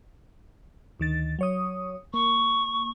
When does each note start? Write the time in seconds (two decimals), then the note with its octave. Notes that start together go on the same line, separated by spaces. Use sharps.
1.00 D2 D#3 A6
1.39 F#3 C#5 D#6
2.14 A#3 C#6